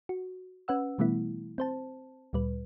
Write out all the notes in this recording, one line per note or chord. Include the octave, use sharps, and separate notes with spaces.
F#4
C#4 B4 F#5 E6
B2 E3 G3 A3 B3 E4
C4 C5 A5
D2 A#2 G3 B4